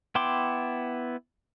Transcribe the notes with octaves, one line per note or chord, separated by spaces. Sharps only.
B3 E4 G5 C6 D6